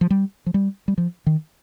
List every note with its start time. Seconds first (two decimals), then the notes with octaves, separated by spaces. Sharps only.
0.01 F3
0.10 G3
0.46 F3
0.54 G3
0.88 G3
0.98 F3
1.26 D#3